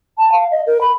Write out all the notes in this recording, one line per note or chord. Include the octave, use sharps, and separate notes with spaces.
A5
F5
D#5
A#4
B5